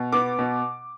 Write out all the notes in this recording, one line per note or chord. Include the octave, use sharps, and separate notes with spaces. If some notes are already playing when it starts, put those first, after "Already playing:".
Already playing: B2
B3 D6
B2